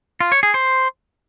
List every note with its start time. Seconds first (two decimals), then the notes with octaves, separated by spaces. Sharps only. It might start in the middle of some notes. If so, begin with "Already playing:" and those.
0.21 F4
0.32 C#5
0.43 G#4
0.54 C5